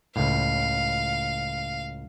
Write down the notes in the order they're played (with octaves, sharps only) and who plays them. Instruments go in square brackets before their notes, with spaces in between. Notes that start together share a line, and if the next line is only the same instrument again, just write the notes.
[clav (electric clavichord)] C#2 A2 [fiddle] F5